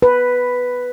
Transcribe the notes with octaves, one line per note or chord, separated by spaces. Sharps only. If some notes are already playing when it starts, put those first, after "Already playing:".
B4